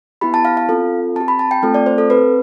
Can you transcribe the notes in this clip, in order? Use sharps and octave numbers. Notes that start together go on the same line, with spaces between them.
B3 E4 G4 B5
A5
F5
F5
C4 F4 A4
C4 G4 A5
B5
A5
G5
A3 C4 F4 A4
D5
C5
A4
C4 G4 B4